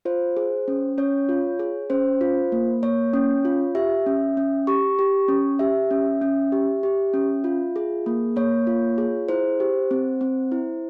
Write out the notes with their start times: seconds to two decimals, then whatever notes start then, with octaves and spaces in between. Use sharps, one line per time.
0.05 F4 C5
0.37 G#4
0.68 C#4
0.98 C#4 C#5
1.29 F4
1.59 G#4
1.90 C#4 C5
2.21 F4
2.52 A#3
2.82 A#3 C#5
3.13 C#4
3.45 F4
3.75 G4 E5
4.06 C#4
4.37 C#4
4.67 G4 C#6
4.99 G4
5.28 C#4
5.59 G4 E5
5.91 C#4
6.21 C#4
6.52 G4
6.83 G4
7.14 C#4
7.44 F4
7.76 G#4
8.06 A#3
8.36 A#3 C#5
8.67 F4
8.98 G#4
9.29 E4 C5
9.60 G4
9.91 C4
10.21 C4
10.52 E4